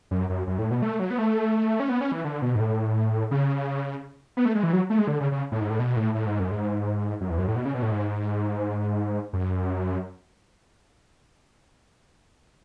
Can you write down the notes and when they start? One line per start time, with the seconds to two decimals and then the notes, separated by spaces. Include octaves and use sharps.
0.11 F#2
0.29 F#2
0.47 F#2
0.58 A2
0.71 B2
0.82 A3
1.00 F#3
1.10 B3
1.18 A3
1.80 C#4
1.89 B3
2.01 C#4
2.12 E3
2.24 D3
2.42 B2
2.55 G#2
2.60 A2
3.31 C#3
4.37 B3
4.46 A3
4.55 G#3
4.63 E3
4.73 F#3
4.90 A3
4.98 G#3
5.07 D3
5.20 C#3
5.32 C#3
5.52 A2
5.61 G#2
5.70 A2
5.79 B2
5.96 A2
6.15 A2
6.26 G#2
6.40 F#2
6.51 G#2
7.21 F#2
7.30 E2
7.38 F#2
7.48 A2
7.56 B2
7.65 C#3
7.75 B2
7.82 A2
7.91 G#2
9.33 F#2